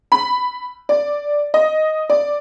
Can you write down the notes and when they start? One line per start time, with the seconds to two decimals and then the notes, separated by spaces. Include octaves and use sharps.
0.12 B5
0.89 D5
1.54 D#5
2.10 D5